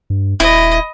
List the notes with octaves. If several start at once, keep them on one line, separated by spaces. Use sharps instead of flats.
G2
D#1 E4 D#5